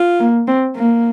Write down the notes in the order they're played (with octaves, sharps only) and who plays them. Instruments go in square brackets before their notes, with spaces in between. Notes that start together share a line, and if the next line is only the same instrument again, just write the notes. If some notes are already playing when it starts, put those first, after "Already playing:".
Already playing: [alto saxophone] F4
[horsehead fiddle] A#3
C4
A#3